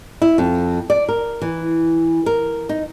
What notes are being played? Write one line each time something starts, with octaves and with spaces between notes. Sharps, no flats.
E4
F2
D5
A#4
E3
A#4
D#4